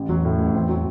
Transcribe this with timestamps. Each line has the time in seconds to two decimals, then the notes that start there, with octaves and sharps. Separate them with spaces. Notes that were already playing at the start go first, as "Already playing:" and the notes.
Already playing: A1
0.09 E2 F#3
0.25 A2
0.39 A1
0.54 E2 C4
0.69 F#3